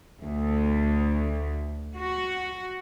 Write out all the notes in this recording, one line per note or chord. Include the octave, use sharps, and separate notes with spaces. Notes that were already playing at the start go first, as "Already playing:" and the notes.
D2
F#4